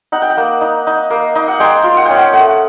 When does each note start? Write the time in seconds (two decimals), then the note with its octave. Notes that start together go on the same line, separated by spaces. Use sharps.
0.12 D#4 F#5
0.22 G5
0.30 F#5
0.37 A#3
0.61 D#4
0.87 D#4
1.10 A#3
1.35 D#4
1.48 F#5
1.60 G#3 G5
1.84 F4
1.97 F#5
2.05 C#4 G5
2.15 F#5
2.33 A3 F#5